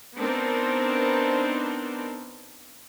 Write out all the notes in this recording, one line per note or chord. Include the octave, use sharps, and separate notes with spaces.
B3 C4 D4 D#4 A#4 C5